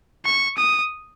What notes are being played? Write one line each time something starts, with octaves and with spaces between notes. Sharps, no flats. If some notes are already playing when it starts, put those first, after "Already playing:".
C#6
D#6